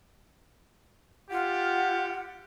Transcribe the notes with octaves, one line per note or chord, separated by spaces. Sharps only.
F4 G4 F#5